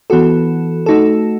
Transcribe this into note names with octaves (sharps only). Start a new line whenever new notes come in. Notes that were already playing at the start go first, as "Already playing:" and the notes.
E3 B3 F#4 A4
A3 D#4 F#4 A4